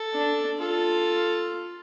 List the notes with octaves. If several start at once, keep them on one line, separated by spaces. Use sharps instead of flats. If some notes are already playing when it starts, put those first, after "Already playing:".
Already playing: A4
D4
F4 A4